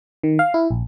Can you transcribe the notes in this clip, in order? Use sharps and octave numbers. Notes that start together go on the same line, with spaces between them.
D#3
F5
E4
A#1